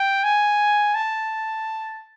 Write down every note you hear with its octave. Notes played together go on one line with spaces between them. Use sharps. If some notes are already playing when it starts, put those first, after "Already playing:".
Already playing: G5
G#5
A5